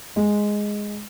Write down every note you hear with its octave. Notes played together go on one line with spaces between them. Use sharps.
G#3